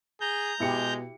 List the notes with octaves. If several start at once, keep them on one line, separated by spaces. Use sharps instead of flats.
G#4 A#5 G6
B2 G#3 E4 G4 C#7